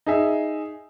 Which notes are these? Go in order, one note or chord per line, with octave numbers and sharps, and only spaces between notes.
D#4 G#4 E5